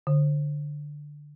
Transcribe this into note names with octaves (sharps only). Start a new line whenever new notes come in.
D3